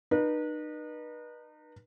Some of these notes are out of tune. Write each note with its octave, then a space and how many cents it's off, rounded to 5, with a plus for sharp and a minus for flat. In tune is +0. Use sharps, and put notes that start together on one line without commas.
D#4 -35 B4 -35